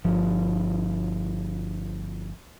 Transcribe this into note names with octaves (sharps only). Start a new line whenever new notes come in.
G1 F3